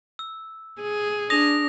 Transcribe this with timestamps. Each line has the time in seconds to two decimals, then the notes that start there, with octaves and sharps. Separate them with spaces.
0.19 E6
0.82 G#4
1.30 D4 D#6 A#6 F7